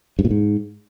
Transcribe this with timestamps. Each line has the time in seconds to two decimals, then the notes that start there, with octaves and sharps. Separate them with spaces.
0.19 G2
0.25 A#2
0.31 G#2